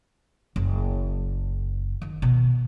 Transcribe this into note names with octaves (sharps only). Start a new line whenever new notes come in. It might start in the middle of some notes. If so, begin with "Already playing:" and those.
F#1
D#3
B2